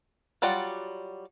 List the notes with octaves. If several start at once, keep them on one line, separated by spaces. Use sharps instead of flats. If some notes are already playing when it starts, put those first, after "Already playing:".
F#3 G3 F4 D5 F#5